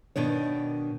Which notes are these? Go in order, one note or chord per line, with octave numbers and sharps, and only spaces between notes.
B2 D#3 D4 C#5